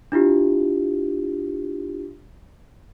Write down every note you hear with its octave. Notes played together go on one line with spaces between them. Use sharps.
D4 E4 F4 G4